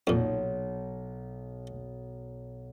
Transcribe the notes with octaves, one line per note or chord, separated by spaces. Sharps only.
B1 F2 A#2